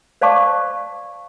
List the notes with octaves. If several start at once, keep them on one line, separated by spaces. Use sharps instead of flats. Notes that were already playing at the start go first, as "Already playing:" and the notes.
C5 D5 F5 A5 C#6 D6